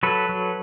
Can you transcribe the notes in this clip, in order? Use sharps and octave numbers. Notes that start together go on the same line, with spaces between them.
F#3 A4 B4
F#3